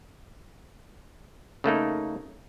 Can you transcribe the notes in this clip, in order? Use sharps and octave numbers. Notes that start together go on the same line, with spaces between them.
C#3 A3 A#3 D#4